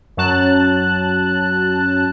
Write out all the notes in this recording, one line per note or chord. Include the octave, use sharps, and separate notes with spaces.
F#2 F#3 A5 F#6